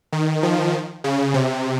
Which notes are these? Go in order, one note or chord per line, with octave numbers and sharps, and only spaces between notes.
D#3
F3
C#3
C3